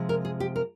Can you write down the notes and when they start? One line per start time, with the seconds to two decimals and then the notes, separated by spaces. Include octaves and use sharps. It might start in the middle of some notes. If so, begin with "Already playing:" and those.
Already playing: C3 F3 G#3
0.09 A#4
0.25 G#4
0.40 G4
0.56 A#4